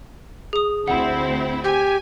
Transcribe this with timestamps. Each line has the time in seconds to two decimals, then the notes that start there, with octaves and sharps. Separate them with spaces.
0.53 G#4 D#6
0.88 D2 C4 E4 F#5
1.64 G4 G#5